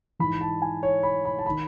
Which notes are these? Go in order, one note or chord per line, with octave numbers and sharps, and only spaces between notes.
G#2 E3 B5
A5
G#5
C#5
B5
B5
A5
D#3 B5